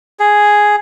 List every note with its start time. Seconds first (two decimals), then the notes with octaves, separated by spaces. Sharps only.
0.19 G#4